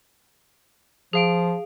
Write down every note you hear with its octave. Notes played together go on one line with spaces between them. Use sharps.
F3 G#4 F5 D7